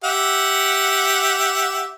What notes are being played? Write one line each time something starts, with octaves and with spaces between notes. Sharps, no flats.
G4 E5 F#5